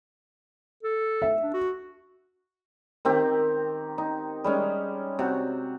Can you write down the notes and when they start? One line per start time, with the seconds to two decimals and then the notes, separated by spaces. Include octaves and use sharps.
0.83 A4
1.22 E5
1.42 D4
1.54 F#4
3.05 D#3 C4 G4
3.98 D#4
4.44 G3 G#3 C#4
5.19 C3 F#4